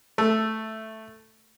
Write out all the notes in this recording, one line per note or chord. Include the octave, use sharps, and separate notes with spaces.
A3